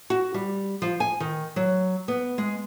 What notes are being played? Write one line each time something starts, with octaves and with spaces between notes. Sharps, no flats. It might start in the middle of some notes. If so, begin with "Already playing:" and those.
F#4
G3
F3
G#5
D#3
F#3
B3
G#3